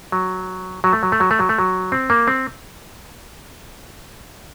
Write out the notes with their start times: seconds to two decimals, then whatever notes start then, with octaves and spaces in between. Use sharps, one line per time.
0.12 F#3
0.84 F#3
0.93 A3
1.03 F#3
1.12 A3
1.20 F#3
1.31 A3
1.39 F#3
1.49 A3
1.58 F#3
1.92 C4
2.10 A#3
2.27 C4